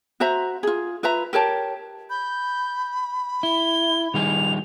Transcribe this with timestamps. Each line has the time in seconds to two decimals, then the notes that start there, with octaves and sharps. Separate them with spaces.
0.20 F#4 C5 E5 A#5
0.63 F4 G#4
1.03 F4 B4 E5 A#5
1.33 G4 A#4 C#5 A5
2.10 B5 G6
3.43 E4 G7
4.14 D#3 G3 G#4 F7